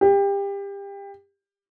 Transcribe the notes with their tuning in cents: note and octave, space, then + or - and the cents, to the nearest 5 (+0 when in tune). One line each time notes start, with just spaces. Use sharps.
G4 +25